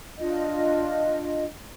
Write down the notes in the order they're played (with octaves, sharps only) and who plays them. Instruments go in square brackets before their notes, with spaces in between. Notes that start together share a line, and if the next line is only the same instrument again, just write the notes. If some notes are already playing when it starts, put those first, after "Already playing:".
[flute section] D4 F4 D#5